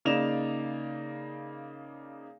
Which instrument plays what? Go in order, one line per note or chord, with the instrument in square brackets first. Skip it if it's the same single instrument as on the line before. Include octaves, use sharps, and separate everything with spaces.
[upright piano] C#3 A#3 D#4 D5 E7 F7